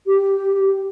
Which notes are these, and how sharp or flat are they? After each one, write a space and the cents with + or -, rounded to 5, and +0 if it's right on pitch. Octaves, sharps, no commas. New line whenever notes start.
G4 -5